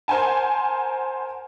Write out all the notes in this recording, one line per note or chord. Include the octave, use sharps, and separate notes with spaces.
A#4 C5 F#5 G#5 A5